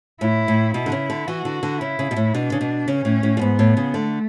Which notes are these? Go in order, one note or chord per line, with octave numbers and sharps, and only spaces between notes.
A2 E4
A2
B2 E4
D3
C#3
D3
E3 F#4
D3
D3
C#3 E4
C#3
B2
A2
B2 D4
C#3
B2
C#3 C#4
A2
A2
F#2
G#2 B3
A2
C#3
D3 A3